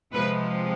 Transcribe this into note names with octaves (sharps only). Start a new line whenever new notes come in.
C3 F3 G#3 B4